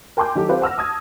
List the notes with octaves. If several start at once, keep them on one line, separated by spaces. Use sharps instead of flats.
A#4 G5 G#5 C6 D6 G6
D#3 F#3 G4 A4
C4 F4 G4 B4 C5
F#5 E6 F6 A#6
A5 D#6 G#6 A#6